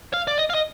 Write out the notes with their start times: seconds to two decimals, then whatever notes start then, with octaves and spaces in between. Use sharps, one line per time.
0.14 F5
0.27 D5
0.38 D#5
0.50 F5
0.55 D#5